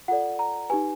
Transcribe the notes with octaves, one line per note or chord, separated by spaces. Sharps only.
F4 A4 D5 F#5
A#5
D#4 G4 B4 G#5